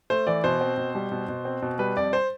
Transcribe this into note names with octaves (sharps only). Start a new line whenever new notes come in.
A3 C5
E3 D5
B2 C5
C4
B2
G3
B2
B2
C4
B2
G3 B4
F2 D5
C5